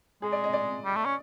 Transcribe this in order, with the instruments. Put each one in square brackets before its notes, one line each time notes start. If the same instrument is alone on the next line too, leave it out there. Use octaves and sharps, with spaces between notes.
[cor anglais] G#3 [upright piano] G#4
[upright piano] D5
D#5
D5
[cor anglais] G3
A3
C#4